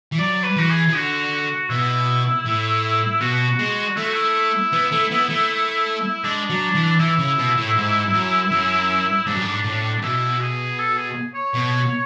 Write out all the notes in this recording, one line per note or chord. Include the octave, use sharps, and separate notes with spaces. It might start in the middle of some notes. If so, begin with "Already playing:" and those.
E3
F#3 D5
B4
E3 F#4
G#4
E3
D3 F#4
B2 E4
A2
B2 F#4
G#3
A3 E4
F#4
E4
B3
A3
B3
A3
G#3 D4
F#3
E3
E3 E4
C#3
B2
A2
G#2
F#2
F#2
G#2 D4
F#2
G#2
A2
B2 E4
G#4
A4
G#4
C#5
B2